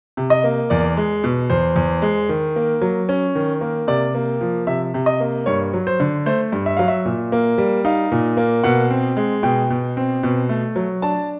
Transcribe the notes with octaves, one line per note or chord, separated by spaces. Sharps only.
C3
D#5
A#3
E2 D5
G#3
B2
E2 C5
E2
G#3
D#3
A#3
F#3
C#4
D#3
A#3
C3 D5
A#3
F3
C3 E5
C3
D#5
A#3
G2 C#5
F#3
C5
D3
A3 C5
G2
E5
F#3 F5
E5
A#2
A#3
G3
D#4 F5
A#2
A#3
B2 F#5
C4
G#3
B2 G5
B2
C4
B2
A3
F#3
D4 A5